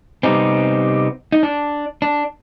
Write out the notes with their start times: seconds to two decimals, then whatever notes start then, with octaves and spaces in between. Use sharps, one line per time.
0.23 C3 G3 B3 C4 D#4
1.32 D#4
1.43 D4
2.02 D4